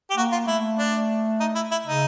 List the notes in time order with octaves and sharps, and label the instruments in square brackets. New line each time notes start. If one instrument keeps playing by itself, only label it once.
[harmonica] G4
[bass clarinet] A#3 [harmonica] F#4
[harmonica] F4
[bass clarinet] A3 [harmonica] E4
[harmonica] D4
D#4
E4
E4
[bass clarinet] C#3 [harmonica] D#4